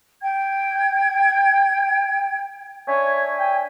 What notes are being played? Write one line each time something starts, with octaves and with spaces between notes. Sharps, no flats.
G5 G#6
D4 C#5 E5 G#5
G5